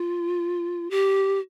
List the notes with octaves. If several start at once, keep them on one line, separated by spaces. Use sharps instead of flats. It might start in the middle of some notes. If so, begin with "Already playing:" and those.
Already playing: F4
G4